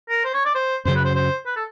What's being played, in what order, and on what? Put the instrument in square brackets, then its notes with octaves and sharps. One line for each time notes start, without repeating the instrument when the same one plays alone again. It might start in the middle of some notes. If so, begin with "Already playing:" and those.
[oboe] A#4
C5
C#5
D5
C5
[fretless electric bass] F#2 C#3 F#3 [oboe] C5
[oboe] B4
C5
C5
B4
A4